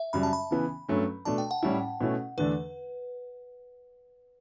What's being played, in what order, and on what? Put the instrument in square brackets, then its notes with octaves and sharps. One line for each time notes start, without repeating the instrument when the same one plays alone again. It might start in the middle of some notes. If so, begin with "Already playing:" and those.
Already playing: [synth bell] E5
[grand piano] F#2 C#3 G3 [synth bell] B5
[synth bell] A5
B5
[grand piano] C#3 E3 B3
G2 F#3 A3 C#4
[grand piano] B2 A3 D4 [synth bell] A5
[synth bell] G5
F#5
[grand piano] A2 G3 C#4 E4
B2 A3 C#4 E4
[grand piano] E2 D3 A3 D4 [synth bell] B4